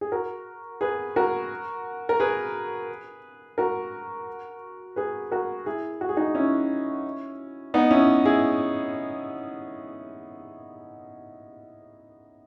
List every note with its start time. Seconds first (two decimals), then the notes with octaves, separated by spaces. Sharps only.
0.01 G#4
0.12 F#4 A#4
0.81 G#4 B4
1.16 F#4 A#4
2.09 A#4
2.20 G#4 B4
3.58 F#4 A#4
4.96 G#4 B4
5.31 F#4 A#4
5.66 E4 G#4
6.01 F#4
6.09 G#4
6.17 D#4 F#4
6.35 C#4 E4
7.74 B3 D#4
7.90 C#4 E4
8.25 E4 G#4